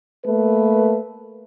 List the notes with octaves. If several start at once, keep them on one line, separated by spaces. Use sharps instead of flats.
A3 A#3 B4